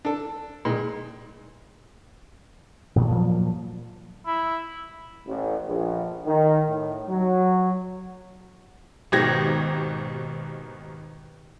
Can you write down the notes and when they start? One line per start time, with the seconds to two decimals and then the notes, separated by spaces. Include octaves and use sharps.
0.05 D4 A4
0.65 A#2 D#3 G#3
2.96 A1 A#2
3.11 A#2 F3 F#3 A#3
4.27 E4
5.26 A1
5.67 A#1
6.25 D#3
6.68 A2
7.08 F#3
9.12 G#1 B2 D#3 G4 G#6 A#6